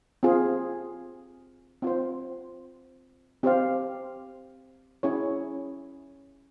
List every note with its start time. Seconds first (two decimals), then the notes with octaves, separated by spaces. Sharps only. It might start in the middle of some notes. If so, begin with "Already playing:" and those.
0.23 C4 F4 G#4
1.82 C4 F4 C5
3.43 C4 G4 C5 F5
5.03 C#4 E4 G#4 C#5